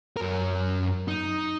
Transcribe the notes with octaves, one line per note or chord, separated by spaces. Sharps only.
F#2 A#4
D#4